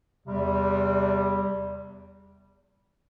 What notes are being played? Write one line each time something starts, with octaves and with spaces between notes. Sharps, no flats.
E2 C3 G3